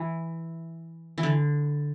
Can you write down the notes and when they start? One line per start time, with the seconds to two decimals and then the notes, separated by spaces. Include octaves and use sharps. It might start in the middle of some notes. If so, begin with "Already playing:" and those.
Already playing: E3
1.18 E3
1.23 D3